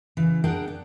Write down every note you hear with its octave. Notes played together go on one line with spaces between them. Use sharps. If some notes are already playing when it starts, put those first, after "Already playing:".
C#3 E3
D4 G#4 A#4 F#5 G5
D4